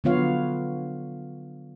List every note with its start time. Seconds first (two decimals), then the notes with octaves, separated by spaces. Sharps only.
0.04 D3 F#3 B3 F4 C#5 F5